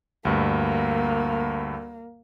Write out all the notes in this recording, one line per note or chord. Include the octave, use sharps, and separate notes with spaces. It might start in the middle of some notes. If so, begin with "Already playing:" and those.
D2 G2 A#3